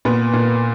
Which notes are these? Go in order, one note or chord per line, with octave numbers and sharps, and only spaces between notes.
A#2 B3 B4
A#2